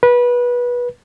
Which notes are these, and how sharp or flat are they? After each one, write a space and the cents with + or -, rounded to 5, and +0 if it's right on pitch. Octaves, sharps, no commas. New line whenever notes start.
B4 -20